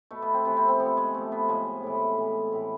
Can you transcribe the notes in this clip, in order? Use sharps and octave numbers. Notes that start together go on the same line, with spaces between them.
B2 A3
B3
C4
C3 E3 B3
C4
C4
C3 F3 B3
G#3
C3 F3 A3
B3
A2 F3 G#3
A2 E3
A2 E3
A2 E3